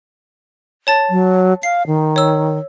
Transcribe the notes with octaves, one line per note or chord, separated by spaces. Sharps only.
C#5 A5 A6
F#3
F5 C7
D#3
C#5 E6